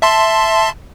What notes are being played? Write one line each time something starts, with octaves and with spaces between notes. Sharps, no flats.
E5 A5 C6